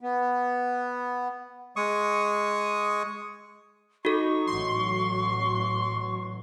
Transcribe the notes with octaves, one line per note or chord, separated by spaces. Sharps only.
B3
G#3 C#6 D#6
D#4 F#4 A4 C#6
A1 F#3 C6